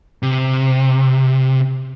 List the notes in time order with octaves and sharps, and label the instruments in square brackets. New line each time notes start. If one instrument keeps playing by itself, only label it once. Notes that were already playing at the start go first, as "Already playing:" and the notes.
[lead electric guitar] C3